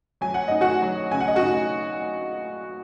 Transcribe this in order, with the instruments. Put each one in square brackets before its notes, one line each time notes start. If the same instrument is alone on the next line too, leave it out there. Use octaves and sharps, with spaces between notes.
[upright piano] F#3 G#5
F#5
D#4 D#5
F#4 F#5
F#3
C#3 G#5
F#5
D#5
F#4 F#5
D#4